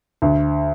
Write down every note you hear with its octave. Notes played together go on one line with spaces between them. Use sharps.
D2